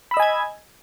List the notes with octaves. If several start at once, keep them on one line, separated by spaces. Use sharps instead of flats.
D#5 G#5 B5 E6 G#6